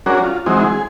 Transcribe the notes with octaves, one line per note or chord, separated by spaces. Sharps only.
F#3 C#4 D4 F#4 G#4 A#4
F4
E3 F#3 G#3 C4 D#4
G#4